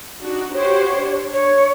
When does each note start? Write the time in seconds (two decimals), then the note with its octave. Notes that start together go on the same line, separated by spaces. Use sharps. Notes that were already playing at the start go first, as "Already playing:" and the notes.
0.22 D4 D#4 F#4
0.54 F#4 G4 C5 C#5
0.97 D4
1.33 C#5